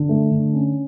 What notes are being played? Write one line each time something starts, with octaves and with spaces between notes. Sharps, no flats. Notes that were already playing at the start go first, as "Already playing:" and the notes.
Already playing: D3
A3
D3
C#4